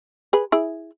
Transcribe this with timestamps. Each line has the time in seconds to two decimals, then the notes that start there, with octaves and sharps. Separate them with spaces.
0.33 G#4 B4
0.52 E4 G#4